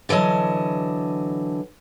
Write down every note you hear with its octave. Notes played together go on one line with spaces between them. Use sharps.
D3 E3 F#3 D#5 A5